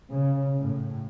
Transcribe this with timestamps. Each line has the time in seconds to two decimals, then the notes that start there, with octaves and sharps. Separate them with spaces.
0.11 C#3
0.60 A2